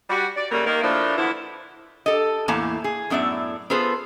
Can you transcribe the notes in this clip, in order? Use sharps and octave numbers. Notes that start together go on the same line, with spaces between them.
G3 F#4
D5
C#3 F#3 G3 A3 A#3
D#3 A#3
A2 F3 A3 A#3 D4
D3 E3 F3 B3 E4
G4 A4 D#5
E2 A2 A#3 G#5 A5
G#4
F#2 A2 B3 D5 E5
B3 F4 G#4 A4 B4 C5